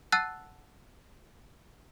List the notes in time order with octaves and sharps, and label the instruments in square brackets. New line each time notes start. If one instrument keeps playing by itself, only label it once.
[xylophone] F#5 A5 E6 F#6 A6 D#7